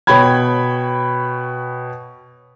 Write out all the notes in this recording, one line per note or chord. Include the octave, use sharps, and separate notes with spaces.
B2 C#5 G5 B5 G#6